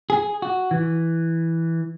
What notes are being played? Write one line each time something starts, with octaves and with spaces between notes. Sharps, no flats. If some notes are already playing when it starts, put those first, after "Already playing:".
G#4
F#4
E3